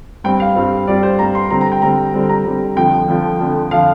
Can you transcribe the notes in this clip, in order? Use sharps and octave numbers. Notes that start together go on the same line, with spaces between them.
G2 G3 C4 G5
F5
G2 G3 C4
G2 G3 C4 D5
C5
G2 G3 C4 A#5
C6
D3 G3 C4 A#5
A#5
G5
D3 G3 C4 A#5
D3 G3 C4
A#5
D3 G3 C4
F2 D3 F3 G5
F2 D3 F3
F2 D3 F3
D3 F3 F5